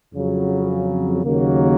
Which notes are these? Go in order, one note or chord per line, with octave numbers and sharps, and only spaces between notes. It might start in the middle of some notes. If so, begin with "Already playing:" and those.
F2 C#3 F#3
D#2 C#3 F#3 A#3